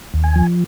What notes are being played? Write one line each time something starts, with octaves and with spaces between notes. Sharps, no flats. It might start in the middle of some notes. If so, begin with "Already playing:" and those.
D#2
G#5
F3